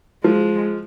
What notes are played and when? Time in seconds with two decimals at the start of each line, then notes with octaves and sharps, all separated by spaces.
0.24 F3 G#3